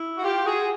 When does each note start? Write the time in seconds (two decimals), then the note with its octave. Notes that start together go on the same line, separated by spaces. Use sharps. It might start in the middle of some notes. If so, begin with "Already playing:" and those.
Already playing: E4
0.16 F#4
0.24 F4 G4
0.45 F#4 G#4